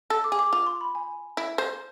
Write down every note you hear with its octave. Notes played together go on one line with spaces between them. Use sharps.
A4 E6
D6
G#4
D6
F4 D6
C6
B5
G#5
E4
C5